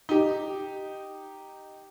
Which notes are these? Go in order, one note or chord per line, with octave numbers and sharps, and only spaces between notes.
D#4 G4